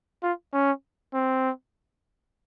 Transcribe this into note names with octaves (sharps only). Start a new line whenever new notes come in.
F4
C#4
C4